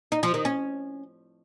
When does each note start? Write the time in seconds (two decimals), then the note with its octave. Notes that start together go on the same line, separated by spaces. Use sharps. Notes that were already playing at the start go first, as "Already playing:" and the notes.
0.12 D#4
0.23 F3
0.34 D#3
0.45 C#4